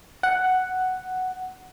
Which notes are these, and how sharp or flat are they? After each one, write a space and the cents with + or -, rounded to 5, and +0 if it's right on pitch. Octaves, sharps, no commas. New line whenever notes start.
F#5 +5